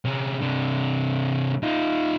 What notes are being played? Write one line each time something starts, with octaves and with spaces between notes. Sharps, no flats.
C3 C#4
C3 D4
D#4 F4